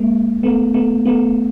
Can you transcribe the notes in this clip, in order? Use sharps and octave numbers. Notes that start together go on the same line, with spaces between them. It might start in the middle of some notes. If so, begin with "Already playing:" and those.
Already playing: G#3 A#3
A3 B3
A3 B3
A3 B3